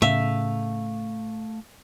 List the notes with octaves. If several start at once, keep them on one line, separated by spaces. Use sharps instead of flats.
A2 C#3 A3 E5 F5